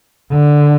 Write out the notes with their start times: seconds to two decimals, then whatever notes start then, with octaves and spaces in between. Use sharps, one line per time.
0.32 D3